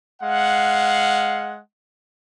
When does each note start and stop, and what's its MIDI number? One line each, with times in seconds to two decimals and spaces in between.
0.22 1.60 56
0.22 1.60 77
0.22 1.60 78